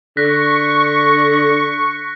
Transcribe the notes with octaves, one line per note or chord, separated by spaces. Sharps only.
D3 C#6 F#6 A#6 B6